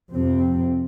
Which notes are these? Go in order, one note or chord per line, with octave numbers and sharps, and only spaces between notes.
F2 C3 C4